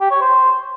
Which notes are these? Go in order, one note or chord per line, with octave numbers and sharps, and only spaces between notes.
G4
C#5
C5